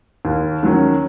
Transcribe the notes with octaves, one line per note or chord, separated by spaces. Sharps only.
D#2
D#3 F#3 C#4